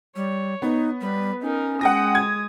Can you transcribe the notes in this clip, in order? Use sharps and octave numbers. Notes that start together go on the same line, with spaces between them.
G3 C#5
B3 D#4
G3 B4
C#4 D#4 A#4
G#3 F#5 G5 D#6 A#6
G#6